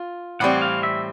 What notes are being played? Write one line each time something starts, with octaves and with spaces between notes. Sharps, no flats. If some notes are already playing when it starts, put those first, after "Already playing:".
Already playing: F4
A2 E3 G3 C4 F#5
F5
E5